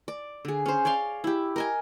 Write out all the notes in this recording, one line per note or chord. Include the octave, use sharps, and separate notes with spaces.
D5
D3 G#4
C#4 C5
C#5 D5 F5 C6
E4 G4
A#4 D#5 G#5